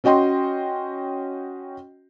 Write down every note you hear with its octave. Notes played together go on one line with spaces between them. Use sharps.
C#4 F#4 D#5 G5 C6